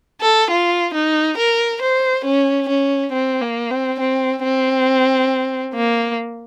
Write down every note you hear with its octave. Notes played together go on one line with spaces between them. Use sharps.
A4
F4
D#4
A#4
C5
C#4
C#4
C4
A#3
C4
C4
C4
A#3